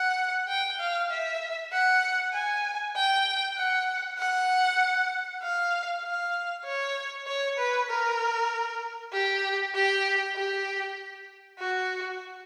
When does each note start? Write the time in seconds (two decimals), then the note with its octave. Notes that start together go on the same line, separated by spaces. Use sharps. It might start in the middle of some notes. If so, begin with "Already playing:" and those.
Already playing: F#5
0.48 G5
0.80 F5
1.10 E5
1.72 F#5
2.33 G#5
2.96 G5
3.57 F#5
4.18 F#5
5.42 F5
6.03 F5
6.65 C#5
7.26 C#5
7.58 B4
7.89 A#4
9.12 G4
9.74 G4
10.35 G4
11.59 F#4